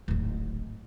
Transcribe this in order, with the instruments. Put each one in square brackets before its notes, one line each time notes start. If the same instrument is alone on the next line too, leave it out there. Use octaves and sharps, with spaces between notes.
[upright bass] D1 G#1